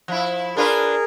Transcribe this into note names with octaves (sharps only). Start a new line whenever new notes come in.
F3 E4
D4 F4 G#4 A#4 B4